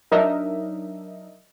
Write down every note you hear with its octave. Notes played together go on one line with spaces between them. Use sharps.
F#3 D4 D#4 A#4 D#5 E5